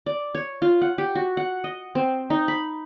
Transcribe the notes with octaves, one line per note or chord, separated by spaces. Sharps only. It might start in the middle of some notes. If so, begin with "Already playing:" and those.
D5
C#5
F4
F#5
G4
F#4
F#5
D#5
C4
D#4
B5